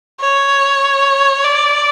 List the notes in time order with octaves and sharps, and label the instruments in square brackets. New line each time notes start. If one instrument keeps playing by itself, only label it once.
[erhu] C#5
D5